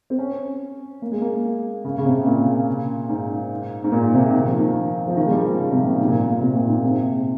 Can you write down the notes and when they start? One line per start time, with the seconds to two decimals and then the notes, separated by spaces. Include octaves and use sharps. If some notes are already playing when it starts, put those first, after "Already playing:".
0.10 C4
0.19 C#4
1.02 A#3
1.12 G#3
1.21 A#3
1.84 C#3
1.98 C#3
2.06 C3
2.26 A#2
3.09 G#2
3.84 G#2
3.92 A#2
4.14 C3
4.33 D#3
4.48 F3
4.60 D#3
5.07 F3
5.17 D#3
5.25 G#3
5.31 G3
5.45 F3
5.59 C#3
5.72 C3
5.87 A#2
6.01 G#2
6.08 A#2
6.14 G#2
6.27 A#2
6.42 C3
6.55 A#2
6.69 G#2
6.84 C3